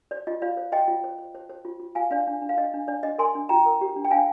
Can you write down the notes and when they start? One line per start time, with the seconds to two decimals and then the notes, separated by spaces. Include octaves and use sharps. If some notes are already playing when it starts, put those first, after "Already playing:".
0.11 C5 D5
0.27 F4 D#5
0.42 F4 D5 F5
0.57 C5
0.72 C5 D#5 G5
0.88 F4
1.04 C5
1.18 C5
1.35 C5
1.49 C5
1.65 F4
1.80 F4
1.95 F4 F5 G#5
2.11 D4 D5 F5
2.27 D4
2.41 D4
2.49 F5
2.57 D4 D#5
2.73 D4
2.88 D4 D5
3.03 D4 D#5
3.18 A#4 G#5 C6
3.35 D4
3.49 F4 G5 A#5
3.66 A#4
3.81 G4
3.96 D4
4.05 G5
4.11 D4 F5 G#5